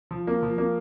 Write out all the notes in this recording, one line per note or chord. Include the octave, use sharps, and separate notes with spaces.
F3
A#3
F3
A#3